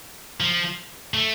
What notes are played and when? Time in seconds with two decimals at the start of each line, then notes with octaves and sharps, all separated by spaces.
0.40 F3
1.14 A3